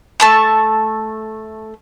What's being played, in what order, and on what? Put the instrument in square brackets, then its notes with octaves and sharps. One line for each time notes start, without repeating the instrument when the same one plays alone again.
[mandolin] A3 A5 C#6